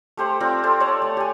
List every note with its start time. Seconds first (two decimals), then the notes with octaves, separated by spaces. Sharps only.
0.17 A3 G4 C5 F#5
0.40 C4 F4 D5 A#5
0.63 G4 A4 C5
0.80 C#5 D5 F#5 A5
1.02 A3
1.17 G4 G#5